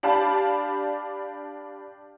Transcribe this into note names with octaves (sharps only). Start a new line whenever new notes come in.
D4 G4 D5 F5 A5 B5